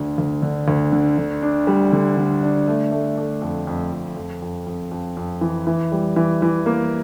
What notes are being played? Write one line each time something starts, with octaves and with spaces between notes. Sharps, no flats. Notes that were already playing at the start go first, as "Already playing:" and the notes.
Already playing: D2 D3
D2
D3
D2
D3
D3
D4
G3
D3
D3
D4
A3
A3
A3
F2
F2
F2
F2
F2
F2
F2
F2
E3
E3
G3
E3
E3
A#3